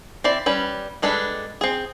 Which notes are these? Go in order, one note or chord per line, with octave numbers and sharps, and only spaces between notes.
C4 E4 D5
G3 C#4 B4
G3 G#3 D4 A4 B4
C4 G#4